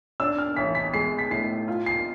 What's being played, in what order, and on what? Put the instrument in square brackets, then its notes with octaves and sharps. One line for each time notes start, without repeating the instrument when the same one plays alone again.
[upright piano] D4 [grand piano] E6
[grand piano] F6
[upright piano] A1 [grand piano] B6
[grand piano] B6
[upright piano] G#3 [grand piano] C7
[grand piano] B6
[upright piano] A2 [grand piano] C7
[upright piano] F4
[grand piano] C7